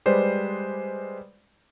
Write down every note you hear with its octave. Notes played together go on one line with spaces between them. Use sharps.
G3 G#3 B4 C5 D5